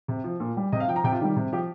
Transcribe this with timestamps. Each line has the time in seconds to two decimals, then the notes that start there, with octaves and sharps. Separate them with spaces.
0.08 C3
0.24 F3
0.40 A#2
0.57 G3
0.72 C3 D#5
0.80 F5
0.88 F3 G5
0.96 A#5
1.04 C3 G5
1.12 F4
1.20 D#3 G3 G4
1.36 C3
1.53 F3 G4